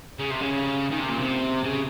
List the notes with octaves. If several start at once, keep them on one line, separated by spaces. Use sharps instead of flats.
C#3
C3
C#3
D#3
C3
A#2
C3
C#3